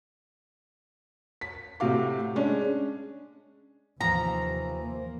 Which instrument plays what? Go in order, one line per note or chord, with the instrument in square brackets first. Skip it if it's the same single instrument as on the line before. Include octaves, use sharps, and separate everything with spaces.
[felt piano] B6
A2 C3 F#4 F5 D6
G#3 C#4 D4
[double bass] D#2 C3 [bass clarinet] E3 [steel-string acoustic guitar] F3 [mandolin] A#5
[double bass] A#3